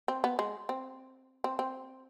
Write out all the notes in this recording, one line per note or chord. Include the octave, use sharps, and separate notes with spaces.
C4
B3
G#3
C4
C4
C4